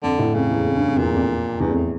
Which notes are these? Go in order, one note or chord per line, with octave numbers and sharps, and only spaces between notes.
F2 D3
A2
F2 C#3
E2
F2
G2
F2
E2 A#2
F2
E2 G2
F2
A2